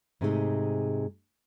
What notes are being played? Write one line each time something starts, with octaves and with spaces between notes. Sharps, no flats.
G#2 C3 G#3 A3 B3 D#4